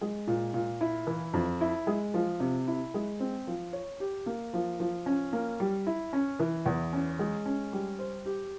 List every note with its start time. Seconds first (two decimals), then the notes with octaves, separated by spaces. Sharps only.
0.01 G#3
0.27 A#2
0.54 A#2
0.81 E4
1.07 E3
1.33 F2
1.61 E4
1.87 G#3
2.14 F3
2.40 C3
2.68 E4
2.94 G#3
3.20 C4
3.47 F3
3.73 C#5
4.00 G4
4.26 A#3
4.53 F3
4.80 F3
5.06 C#4
5.33 A#3
5.60 G3
5.87 E4
6.13 C#4
6.40 E3
6.66 E2
6.93 C#4
7.19 G#3
7.46 C#4
7.73 G3
7.99 C5
8.26 G4